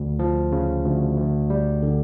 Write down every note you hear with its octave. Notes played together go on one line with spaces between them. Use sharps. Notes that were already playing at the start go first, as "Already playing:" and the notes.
Already playing: D2
F3
C#3
D2
D2
G3
D3